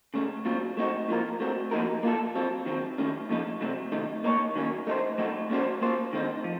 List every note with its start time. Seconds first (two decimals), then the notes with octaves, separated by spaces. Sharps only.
0.14 C#3 A3 C#4
0.45 A#2 F#3 C4 F4
0.77 A3 C4 D#4 F#4
1.08 A2 F3 A#3 F4 A#4
1.40 A3 C4 F#4
1.71 F3 A#3 D#4 F#4 A#4
2.03 A#3 F4 A4
2.35 F#3 C4 F4
2.66 D#3 F#3 C4
2.98 D#3 A3 C#4
3.29 A#2 F3 A3 D#4
3.61 C3 F#3 A3 C4
3.92 C3 D#3 A3 D#4
4.24 A#3 D#4 A#4 C#5
4.56 D#3 F#3 A#3 C#4
4.87 A3 D#4 A4 C5
5.18 F#3 A3 C4 D#4 F#4
5.50 A#2 A3 C#4 F#4 C5
5.82 A#3 F4 C5
6.13 D#3 A3 C4 D#4
6.44 F3